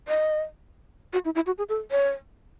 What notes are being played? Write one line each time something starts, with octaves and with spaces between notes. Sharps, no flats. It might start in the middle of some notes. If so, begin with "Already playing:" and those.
D#5
F#4
E4
E4
F#4
G#4
A4
C#5